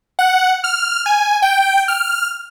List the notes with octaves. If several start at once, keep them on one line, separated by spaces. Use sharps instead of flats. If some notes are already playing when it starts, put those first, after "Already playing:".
F#5
F6
G#5
G5
F6